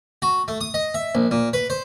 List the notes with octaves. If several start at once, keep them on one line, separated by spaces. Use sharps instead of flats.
F#4
A3
D#6
D#5
E5
A#1
A#2
B4
C5